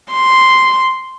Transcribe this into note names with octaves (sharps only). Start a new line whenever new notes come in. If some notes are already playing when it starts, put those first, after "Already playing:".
C6